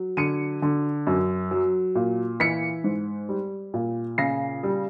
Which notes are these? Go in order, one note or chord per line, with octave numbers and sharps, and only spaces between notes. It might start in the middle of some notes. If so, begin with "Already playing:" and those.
Already playing: F#3
D3 C#7 D#7
D3
F#2
F#3
A#2
E3 B6 C#7
G#2
G3
A#2
C#3 A#6 C7
G3